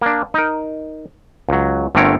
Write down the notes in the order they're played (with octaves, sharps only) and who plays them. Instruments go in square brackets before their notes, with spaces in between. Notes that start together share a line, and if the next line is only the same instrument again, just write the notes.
[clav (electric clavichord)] A#3 D4
D#4 A#4
C#2 F#3
G1 D3 A3 C4 A#4 C#5